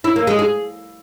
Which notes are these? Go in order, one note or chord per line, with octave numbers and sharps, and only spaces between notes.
E4
A#3
G#3
G#4